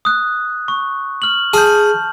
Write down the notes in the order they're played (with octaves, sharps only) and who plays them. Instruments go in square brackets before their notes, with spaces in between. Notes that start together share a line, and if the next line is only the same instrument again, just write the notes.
[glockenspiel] D#6 F#6
C#6
F6 F#7
[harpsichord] G#4 [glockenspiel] A5 F6 G6